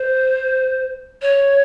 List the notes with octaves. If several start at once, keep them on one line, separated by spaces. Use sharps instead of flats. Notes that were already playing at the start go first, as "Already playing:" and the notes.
Already playing: C5
C#5